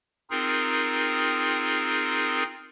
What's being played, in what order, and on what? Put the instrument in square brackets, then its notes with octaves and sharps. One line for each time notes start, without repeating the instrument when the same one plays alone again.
[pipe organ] C4 D#4 F4 G#4 A#4